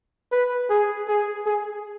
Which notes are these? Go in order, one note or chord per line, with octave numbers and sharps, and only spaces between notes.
B4
G#4
G#4
G#4